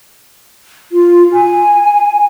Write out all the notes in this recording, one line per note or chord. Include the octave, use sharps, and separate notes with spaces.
F4
G#5